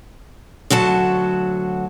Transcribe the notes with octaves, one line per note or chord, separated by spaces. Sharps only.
D2 F#3 F#4 A5